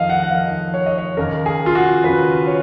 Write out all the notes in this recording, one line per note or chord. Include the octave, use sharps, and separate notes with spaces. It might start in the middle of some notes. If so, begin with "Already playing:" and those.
Already playing: F2 D#3 D#5 F5
F#5
F#5
F2 D#3 F5
C#5
D#5
C#5
D#2 C#3 A#4
G#4
F4
F#4
D#2 C#3 B4
C#5